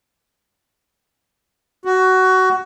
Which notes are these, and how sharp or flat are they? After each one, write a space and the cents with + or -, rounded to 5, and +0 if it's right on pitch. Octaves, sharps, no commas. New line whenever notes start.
F#4 +15